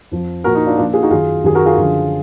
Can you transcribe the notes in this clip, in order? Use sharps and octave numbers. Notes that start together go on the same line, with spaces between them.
F2 F3
A#2 F3 F#4 A#4
D#4
D4 F4
A#2 F3 D4 F4
F4 G#4
D#4 F#4
F#2 D#3 F4 G#4
F#2 D#3 G#4
F#4 A#4
F4 G#4
F#2 D3 F3